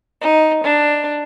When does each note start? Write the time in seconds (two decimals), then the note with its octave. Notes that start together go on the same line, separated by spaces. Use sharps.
0.22 D#4
0.64 D4